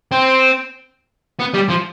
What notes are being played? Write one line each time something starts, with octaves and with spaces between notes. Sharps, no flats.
C4
B3
G3
F3